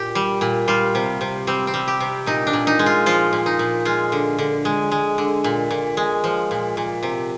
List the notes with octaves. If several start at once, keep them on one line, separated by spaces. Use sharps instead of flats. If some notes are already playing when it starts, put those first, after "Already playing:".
Already playing: A#2 G4
G3
A#2
G3 F4
C3
C3
G3 C4
C4
G3
G4
C3
A#2 D#4
D4
A#2
D#4
G#3
F4
F3 F4
A#2
D#4
A#2
G#3 F4
D3
D3
G#3
G#3
D3
A#2
A#2
G#3
F3
A#2
A#2
C3